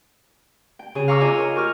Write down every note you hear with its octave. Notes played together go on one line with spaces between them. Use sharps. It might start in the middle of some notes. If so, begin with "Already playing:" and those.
G5
C#3 G#4
F5 A#5 C#6 D6 E6 F6
F4 D#5 G#5 A#5 D6
A#4
G4 C#6 F6